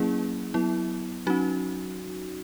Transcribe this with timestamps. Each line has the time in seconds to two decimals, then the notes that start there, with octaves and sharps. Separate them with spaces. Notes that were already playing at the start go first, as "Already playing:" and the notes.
Already playing: F#3 A#3 C#4 E4 G#4
0.54 F#3 B3 E4
1.26 F#3 C#4 D#4 F#4